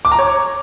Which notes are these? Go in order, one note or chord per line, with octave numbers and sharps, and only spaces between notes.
D6
A#5
C#5